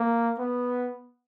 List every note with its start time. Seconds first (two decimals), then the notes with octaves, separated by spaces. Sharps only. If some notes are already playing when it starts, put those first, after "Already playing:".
Already playing: A#3
0.39 B3